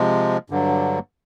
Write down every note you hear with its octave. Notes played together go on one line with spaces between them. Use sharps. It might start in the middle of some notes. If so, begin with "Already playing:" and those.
Already playing: C3 F3 G#3
G2 D3 F#3